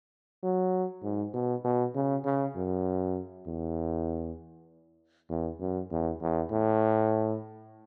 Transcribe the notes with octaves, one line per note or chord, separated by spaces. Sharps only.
F#3
G#2
B2
B2
C#3
C#3
F#2
E2
E2
F#2
E2
E2
A2